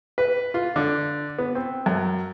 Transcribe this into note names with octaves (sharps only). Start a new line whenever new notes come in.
B4
F4
D3
B3
C4
F#2